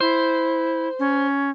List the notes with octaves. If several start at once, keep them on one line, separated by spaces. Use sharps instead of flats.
E4 C5
C#4